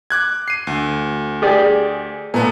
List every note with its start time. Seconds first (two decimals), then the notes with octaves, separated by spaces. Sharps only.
0.10 D6 F#6 G#6
0.48 C7 D#7
0.67 D2
1.42 G4 G#4 D5
2.34 A#2 A3 B3